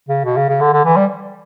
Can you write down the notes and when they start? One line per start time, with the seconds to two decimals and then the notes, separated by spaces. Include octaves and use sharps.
0.09 C#3
0.25 B2
0.36 C#3
0.49 C#3
0.61 D3
0.73 D3
0.85 E3
0.96 G3